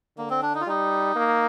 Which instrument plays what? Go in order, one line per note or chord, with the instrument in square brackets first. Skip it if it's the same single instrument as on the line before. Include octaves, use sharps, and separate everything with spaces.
[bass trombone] D3 [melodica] A#3
[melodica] C4
D4
D#4
F4
[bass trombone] G3 [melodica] D#4
[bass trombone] A#3